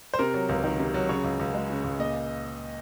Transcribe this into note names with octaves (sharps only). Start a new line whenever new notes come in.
C5
C3 A#4
F#3
C#2
D#3
C3
F#3
C#3 C#5
C#2
C#2
G#3
C#3
C#2
A#2 D#5